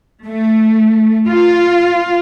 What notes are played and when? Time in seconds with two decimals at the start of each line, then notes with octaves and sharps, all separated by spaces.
0.24 A3
1.28 F4